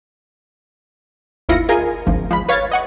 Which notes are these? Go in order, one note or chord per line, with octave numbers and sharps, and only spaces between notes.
G1 D#2 E4 F4 A#6 C#7
F4 G#4 A#4 D#5 G#5
G#1 D2 F3
F3 G#3 B5
B4 C#5 F5 G#6 A6
D#5 F#5 C#6